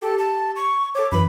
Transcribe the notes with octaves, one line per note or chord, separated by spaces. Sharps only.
G4 A4
A5
C#6
A4 C#5 D6
F#2 E3 B5